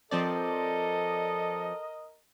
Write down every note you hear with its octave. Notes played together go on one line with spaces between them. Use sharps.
F3 C4 A4 A#4 D5 D#5